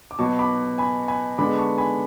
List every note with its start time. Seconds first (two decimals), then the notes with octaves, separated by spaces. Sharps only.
0.11 D6
0.19 B2 F#3 B3 A5 C#6
0.39 B5 D6
0.78 G#5 B5
1.08 G#5 B5
1.38 D3 G#3 B3 B5 D6
1.57 A5 C#6
1.78 G#5 B5